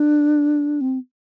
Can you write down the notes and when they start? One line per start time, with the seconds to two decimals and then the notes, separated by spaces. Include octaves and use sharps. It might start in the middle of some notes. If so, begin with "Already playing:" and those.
Already playing: D4
0.81 C4